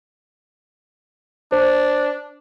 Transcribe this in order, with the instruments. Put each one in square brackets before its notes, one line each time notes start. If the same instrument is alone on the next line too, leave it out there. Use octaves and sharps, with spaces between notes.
[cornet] D4 [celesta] C5